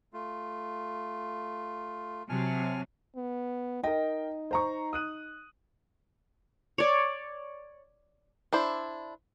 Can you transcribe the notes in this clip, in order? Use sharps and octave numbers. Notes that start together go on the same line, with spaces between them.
A3 F4
C3 F#3 G#5 A5 F6
B3
D#4 A#4 D#5 G5
C5 A#5 C#6
D#6 F#6 D#7
C#5 D5
D4 E4 C5